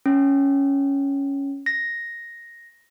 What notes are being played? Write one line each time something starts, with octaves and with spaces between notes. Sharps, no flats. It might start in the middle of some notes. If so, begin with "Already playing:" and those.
C#4
A#6